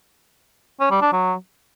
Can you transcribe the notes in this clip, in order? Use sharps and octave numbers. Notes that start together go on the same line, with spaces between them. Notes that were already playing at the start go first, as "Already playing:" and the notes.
C#4
G3
D4
F#3